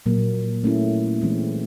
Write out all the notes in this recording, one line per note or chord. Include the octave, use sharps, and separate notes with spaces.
A#2 F#3 A#3
A3 C#4 E4
E3 G#3 C4